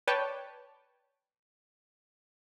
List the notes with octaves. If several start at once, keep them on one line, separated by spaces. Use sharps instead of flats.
B4 C#5 D5 G5 A5